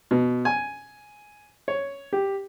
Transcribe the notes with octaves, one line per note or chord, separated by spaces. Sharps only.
B2
G#5
C#5
G4